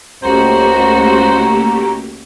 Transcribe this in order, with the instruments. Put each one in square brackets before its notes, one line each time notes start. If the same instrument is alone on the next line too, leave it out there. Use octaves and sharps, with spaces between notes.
[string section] C#2 F#4 [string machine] A3 A#3 G4 [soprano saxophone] C5 [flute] A#5